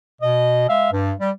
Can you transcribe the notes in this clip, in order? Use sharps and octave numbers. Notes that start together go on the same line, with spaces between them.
B2 D#5
G#3 E5 F5
G2
G3